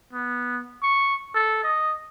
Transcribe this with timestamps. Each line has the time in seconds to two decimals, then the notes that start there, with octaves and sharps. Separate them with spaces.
0.13 B3
0.82 C#6
1.35 A4
1.64 D#5